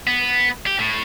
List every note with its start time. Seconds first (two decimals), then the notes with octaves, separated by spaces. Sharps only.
0.07 B3
0.67 G4
0.79 A2